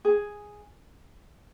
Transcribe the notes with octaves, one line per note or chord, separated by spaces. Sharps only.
G#4